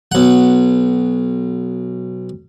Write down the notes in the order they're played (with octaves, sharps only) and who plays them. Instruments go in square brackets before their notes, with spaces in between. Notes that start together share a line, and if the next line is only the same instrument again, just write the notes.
[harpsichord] B1 F#5